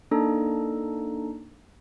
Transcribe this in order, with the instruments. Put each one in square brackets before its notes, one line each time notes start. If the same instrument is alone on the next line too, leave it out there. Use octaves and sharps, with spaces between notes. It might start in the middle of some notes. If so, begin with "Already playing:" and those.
[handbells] A#3 D4 D#4 A4 A#5